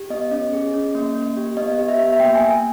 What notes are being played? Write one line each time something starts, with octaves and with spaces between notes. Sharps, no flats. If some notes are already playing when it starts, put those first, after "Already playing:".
Already playing: G4
B3 D#5
C#4
G#4
C#4
A#3
A#3
G4
B3 D#5
G4
E5
B3
E5
A#3 G5
A#3 G#5